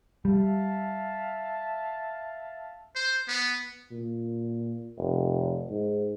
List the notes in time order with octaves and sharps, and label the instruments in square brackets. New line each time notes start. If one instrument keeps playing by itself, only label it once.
[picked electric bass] G3 [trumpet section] E5 F5 A5
[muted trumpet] C5
B3
[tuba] A#2
F1
G#2